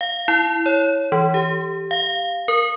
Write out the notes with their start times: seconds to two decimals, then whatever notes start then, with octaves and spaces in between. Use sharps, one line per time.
0.01 F5
0.28 E4
0.66 C#5
1.12 E3
1.34 G4
1.91 F5
2.48 A#4